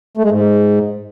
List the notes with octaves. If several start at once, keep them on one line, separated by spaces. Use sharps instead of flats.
A3
G#3
G#2